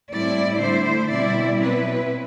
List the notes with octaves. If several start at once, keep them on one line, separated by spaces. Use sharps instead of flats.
A2 G3 C4 E4 D5
D3 A3 E4 C5
B2 G3 C4 E4 D5
B2 F#3 C4 E4 B4